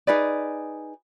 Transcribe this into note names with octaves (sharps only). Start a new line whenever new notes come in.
D#4 G#4 B4 D5